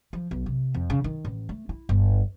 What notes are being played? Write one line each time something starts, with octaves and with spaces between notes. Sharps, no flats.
F3
B1
C3
F2
C#3
D#3
A1
A3
E4
G1